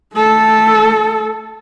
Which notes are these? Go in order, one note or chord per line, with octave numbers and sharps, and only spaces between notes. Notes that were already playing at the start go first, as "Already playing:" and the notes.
A3 A4